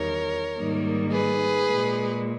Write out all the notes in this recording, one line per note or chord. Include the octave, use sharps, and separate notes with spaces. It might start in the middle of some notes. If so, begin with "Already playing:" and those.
Already playing: E2 D#3 G3 A#4 C#5
G#2 D#3 G3 A#3
G#4 B4
A#2 G#3